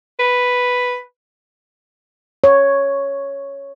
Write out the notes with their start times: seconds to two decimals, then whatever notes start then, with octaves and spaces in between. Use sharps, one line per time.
0.20 B4
2.44 C#5